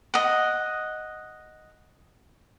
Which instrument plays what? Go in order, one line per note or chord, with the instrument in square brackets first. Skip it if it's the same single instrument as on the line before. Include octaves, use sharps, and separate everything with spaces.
[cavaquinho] D#5 F#5